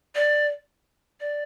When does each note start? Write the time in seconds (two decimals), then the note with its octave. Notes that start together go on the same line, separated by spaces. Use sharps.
0.15 D5
1.20 D5